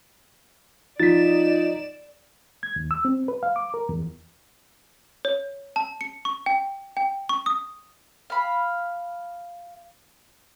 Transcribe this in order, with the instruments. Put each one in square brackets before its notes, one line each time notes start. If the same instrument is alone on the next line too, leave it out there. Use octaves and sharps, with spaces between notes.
[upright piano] F3 [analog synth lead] D#4 [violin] D5 E7 [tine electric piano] A6 B6
[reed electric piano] G#6
D#2
E6
C4
B4
F5
D6
A#4
E2
[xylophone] C#5
A5
C#7
C#6
G5
G5
C#6
D#6
[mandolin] F5 B5